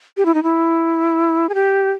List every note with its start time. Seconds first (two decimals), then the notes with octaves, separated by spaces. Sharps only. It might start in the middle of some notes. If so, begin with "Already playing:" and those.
0.17 G4
0.26 E4
0.34 D#4
0.43 E4
1.49 G#4
1.55 G4